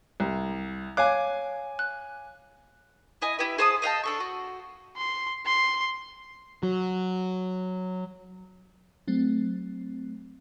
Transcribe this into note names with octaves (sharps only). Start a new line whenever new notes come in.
C2
C#5 F5 G#5 D6 F#6
F#6
E4 D#5 G#5
E4 G4 B4
G#4 C5 A5 D#6
D#5 F5 G5 A5
D4 A4 C#6
F#4
C6
C6
F#3
F#3 A3 C4